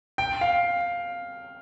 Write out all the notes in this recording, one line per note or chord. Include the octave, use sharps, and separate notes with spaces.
G5
F5